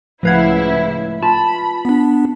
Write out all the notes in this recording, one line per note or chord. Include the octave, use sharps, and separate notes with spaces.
C#2 A2 F3 E4 B4 F5 F#5 G#6
F4 A5 B5
B3 D4